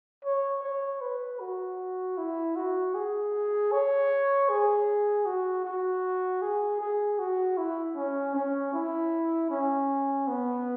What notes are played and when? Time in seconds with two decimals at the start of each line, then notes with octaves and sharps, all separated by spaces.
0.25 C#5
0.63 C#5
1.01 B4
1.40 F#4
2.18 E4
2.56 F#4
2.95 G#4
3.72 C#5
4.49 G#4
5.26 F#4
5.65 F#4
6.42 G#4
6.81 G#4
7.19 F#4
7.58 E4
7.96 C#4
8.35 C#4
8.73 E4
9.50 C#4
10.28 B3